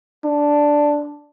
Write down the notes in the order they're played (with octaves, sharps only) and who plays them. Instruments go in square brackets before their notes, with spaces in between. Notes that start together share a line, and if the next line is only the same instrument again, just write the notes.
[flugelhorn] D4